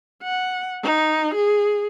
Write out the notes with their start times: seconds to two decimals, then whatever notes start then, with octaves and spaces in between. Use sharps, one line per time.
0.23 F#5
0.83 D#4
1.35 G#4